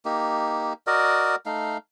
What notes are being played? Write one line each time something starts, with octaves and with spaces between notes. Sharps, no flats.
A#3 D#4 G4
F#4 A#4 D5 D#5
A3 D#4 F5